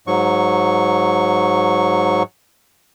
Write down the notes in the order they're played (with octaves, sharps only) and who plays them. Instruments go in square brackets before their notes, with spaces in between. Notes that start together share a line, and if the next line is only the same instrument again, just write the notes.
[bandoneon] G#2 F#3 C#6